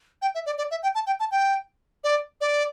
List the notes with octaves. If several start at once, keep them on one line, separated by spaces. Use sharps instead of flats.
G5
E5
D5
D5
E5
G5
A5
G5
A5
G5
D5
D5